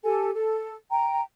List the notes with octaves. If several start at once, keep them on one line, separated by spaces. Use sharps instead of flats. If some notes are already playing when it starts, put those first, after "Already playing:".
G4 A4 G#5
A4
G5 A#5